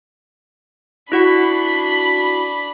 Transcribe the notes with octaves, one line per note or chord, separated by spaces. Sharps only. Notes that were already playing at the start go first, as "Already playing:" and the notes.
D4 E4 F#4 F#5 B5